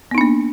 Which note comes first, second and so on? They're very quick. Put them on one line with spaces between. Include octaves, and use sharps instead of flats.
B3 D#4 D4 A#3